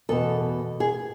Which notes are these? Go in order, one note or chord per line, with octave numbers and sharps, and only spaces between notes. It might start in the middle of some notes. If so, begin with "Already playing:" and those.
E2 B2 A4
G#4